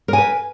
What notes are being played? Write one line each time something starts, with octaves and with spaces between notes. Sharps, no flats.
A#4 B4 G#5